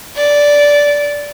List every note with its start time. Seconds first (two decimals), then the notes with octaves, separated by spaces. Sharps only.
0.16 D5